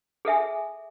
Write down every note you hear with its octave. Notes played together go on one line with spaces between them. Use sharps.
G#4 A4 E5 G#5